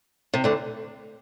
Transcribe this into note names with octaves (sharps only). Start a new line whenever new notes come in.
C3
D2 D3